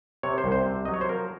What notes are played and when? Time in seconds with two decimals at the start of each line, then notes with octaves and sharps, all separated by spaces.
0.23 C3 C#5
0.38 C5
0.44 C2
0.52 C5
0.66 C3
0.85 F#3 D#5
0.94 C#5
1.01 C5
1.09 F3 A#4